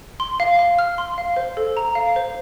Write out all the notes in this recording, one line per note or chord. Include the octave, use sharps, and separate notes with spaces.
C6
F5
F5
F6
C6
F5
C5
A4
A#5
F5
C5